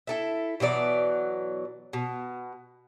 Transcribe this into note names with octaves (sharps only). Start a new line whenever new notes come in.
E4 A4 E5
B2 E3 F#3 D5
B2